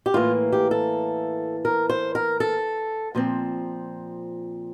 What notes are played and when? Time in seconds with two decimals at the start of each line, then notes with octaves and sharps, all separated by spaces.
0.06 G4
0.14 A2 E3 A#3 F4
0.52 G4
0.71 A4
1.65 A#4
1.89 C5
2.15 A#4
2.40 A4
3.15 A#2 F3 C4